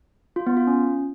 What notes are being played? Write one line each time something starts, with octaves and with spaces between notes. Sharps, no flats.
F4
B3
F4
C#4